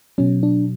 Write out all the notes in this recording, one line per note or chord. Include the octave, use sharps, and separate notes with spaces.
B2 F#3 C#4
D4